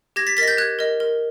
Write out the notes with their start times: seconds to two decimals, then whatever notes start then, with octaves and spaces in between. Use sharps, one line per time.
0.16 G4 G#6 A#6
0.27 A6 B6
0.37 A#4 A6 B6
0.41 D#5 A#6
0.47 G6 A6
0.58 G4 F#6 G#6
0.79 A#4 D#5
1.00 A#4